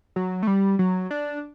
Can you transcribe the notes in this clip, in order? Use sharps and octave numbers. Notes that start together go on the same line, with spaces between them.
F#3
A3
G3
F#3
D4